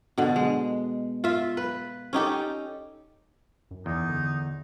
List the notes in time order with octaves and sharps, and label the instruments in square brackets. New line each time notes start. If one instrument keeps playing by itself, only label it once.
[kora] B2 D3
G#3
F4 E5
B4
C#4 D#4 G4 A4
[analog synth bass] F#2
[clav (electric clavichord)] E2 [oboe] D#4
[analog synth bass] D3